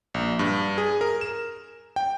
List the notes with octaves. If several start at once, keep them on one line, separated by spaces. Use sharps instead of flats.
A#1
G2
G#4
A#4
E7
G5